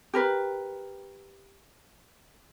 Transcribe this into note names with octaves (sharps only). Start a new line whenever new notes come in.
G4 A#4 B4